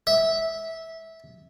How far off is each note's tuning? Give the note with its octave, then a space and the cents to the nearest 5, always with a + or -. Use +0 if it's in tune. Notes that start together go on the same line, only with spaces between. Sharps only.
E5 -15